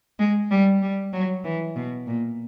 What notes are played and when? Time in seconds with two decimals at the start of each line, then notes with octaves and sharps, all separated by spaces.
0.19 G#3
0.51 G3
0.82 G3
1.13 F#3
1.45 E3
1.76 B2
2.07 A#2